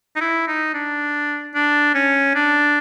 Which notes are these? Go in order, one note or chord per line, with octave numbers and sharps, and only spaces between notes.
D#4
E4
D#4
D4
D4
C#4
D4